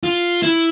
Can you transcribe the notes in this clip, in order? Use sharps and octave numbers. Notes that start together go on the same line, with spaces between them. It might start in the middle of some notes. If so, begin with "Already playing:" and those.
F4
E4